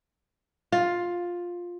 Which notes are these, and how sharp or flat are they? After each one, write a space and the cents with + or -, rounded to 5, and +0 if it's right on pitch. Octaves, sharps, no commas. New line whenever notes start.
F4 +10